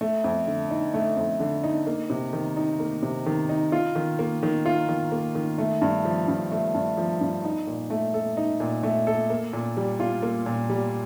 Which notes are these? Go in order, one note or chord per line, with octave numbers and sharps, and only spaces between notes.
A3
F2
D3
D#4
A3
F2
D3
D#4
A#3
C3
D#3
D#4
A#3
C3
D#3
D#4
F4
D#3
A#3
D#3
F4
D#3
A#3
D#3
A3
G2
F3
G2
A3
G2
F3
G2
D#4
A#2
A3
A4
D#4
A#2
A3
A4
A#3
A#2
G3
F4
A#3
A#2
G3